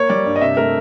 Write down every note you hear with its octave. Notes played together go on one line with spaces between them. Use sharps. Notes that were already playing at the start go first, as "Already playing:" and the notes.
Already playing: A#3 C#5
G3 D5
G2
D#5
C3 E5
A3 A#4